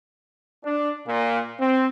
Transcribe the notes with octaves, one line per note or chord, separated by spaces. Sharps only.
D4
A#2
C4